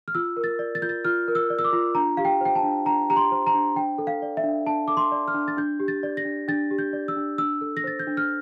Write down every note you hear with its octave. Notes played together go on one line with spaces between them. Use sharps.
F6
F4 E6
A#4
A6
D5
A6
F4 G6
A6
F4 F6
A#4
E6
D5
E6
D6
F4
D4 A#5
G4 F5
G5
C5 G5
A5
D4
D4 A#5
G4 A#5
C6
C5
A#5
D4
D4 G5
A4
F5
D5
E5
D4
D4 A5
A4 D6
C6
D5
F6
D4
A6
D4 G6
G4
A6
D5
A#6
D4
D4 A6
G4
G6
D5
E6
D4
D4 E6
A4
A#6
C5 A6
G6
D4
F6